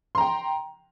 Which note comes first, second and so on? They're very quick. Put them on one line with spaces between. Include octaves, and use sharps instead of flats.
C6 A#5 G5